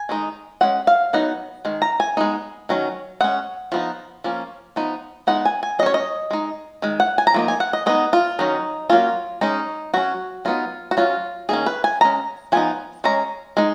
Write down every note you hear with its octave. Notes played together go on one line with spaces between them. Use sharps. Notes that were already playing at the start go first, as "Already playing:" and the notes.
Already playing: G#5
D#3 G#3 D#4
G#3 C#4 F#5
F5
F#3 B3 D#4 F#5
D#3 G#3
A#5
G#5
G#3 B3 D#4
D#3 F#3 C#4
G#3 C#4 F#5
F3 B3 D#4
F3 A#3 C#4
F3 B3 D#4
G#3 B3 D#4 F#5
G#5
G#5
F#3 C#4 C#5 D#5
D#5
G#3 D#4
D#3 G#3
F#5
G#5
A#5
F3 A#3 D#4
G#5
F#5
D#5
G#3 B3 D#4 D#5
F4
D#3 F#3 C#4 D#4
F#3 A#3 C#4 F4
G#3 C#4 D#4
F#3 C#4 F#4
F#3 B3 D#4 F4
F#4
F#3 C#4 F4
D#3 A#3 C#4 G#4
B4
G#5
G#3 C#4 A#5
F3 B3 D#4 G#5
G#3 C#4 A#5
G#3 D#4